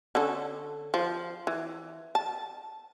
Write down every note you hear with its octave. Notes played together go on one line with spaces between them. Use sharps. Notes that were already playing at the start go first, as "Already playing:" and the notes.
D3 C#4 A4
F3 C5
E3
A5